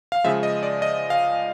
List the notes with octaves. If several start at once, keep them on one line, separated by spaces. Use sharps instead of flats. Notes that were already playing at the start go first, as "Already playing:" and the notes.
F5
C#3 F3 G#3 E5
D#5
D5
D#5
F5